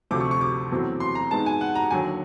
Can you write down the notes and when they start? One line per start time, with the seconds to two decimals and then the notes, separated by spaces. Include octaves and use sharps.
0.11 D2 C3 F3 A3 C4 D6
0.20 C#6
0.31 C#6
0.41 D6
0.71 E2 B2 F#3 A3 C4
1.00 C6
1.15 A#5
1.31 G#2 D#3 G#3 B3 A5
1.46 G#5
1.61 F#5
1.75 A#5
1.91 D#2 D3 F#3 G#5